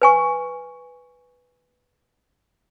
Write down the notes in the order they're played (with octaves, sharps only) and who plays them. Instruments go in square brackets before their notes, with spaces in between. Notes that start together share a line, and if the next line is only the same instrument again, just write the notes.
[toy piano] B4 G#5 C#6